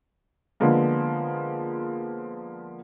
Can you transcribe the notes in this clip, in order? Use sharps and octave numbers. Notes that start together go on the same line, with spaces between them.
D3 F3 G#3 A#3 B3